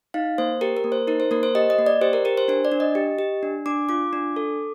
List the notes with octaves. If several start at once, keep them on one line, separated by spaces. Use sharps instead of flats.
D#4 F5
A#3 C5
G4 A#4
A#4
A#3
C5
D#4 A#4
C5
A#3 A#4
C5
G4 D#5
D#5
A#3
D5
G4 C5
A#4
G4 A#4
C5
D4 C5
D5
D4
D#5
G4
G4
D4
D4 D6
F4 D6
D4
A4